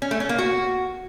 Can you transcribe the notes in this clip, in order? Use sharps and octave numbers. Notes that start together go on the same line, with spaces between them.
C#4
A3
C#4
A#3
F#4